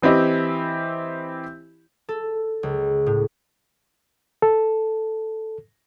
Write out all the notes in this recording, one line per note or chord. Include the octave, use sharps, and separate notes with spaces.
E3 C4 E4 G4 D#5
A4
C#2
A2
A4